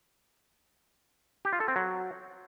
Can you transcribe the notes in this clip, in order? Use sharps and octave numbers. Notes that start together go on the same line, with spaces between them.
G4
F4
A4
C4
F#3